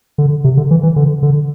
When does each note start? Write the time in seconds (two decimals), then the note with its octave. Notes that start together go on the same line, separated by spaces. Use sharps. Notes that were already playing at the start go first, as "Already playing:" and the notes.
0.18 D3
0.44 C3
0.57 D3
0.71 E3
0.83 E3
0.96 D3
1.23 D3